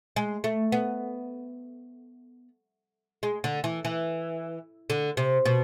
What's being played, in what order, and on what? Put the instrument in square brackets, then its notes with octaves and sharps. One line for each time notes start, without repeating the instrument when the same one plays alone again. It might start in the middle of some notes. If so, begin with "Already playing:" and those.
[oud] G#3
A3
B3
G#3
D3
E3
E3
D3
C3
B2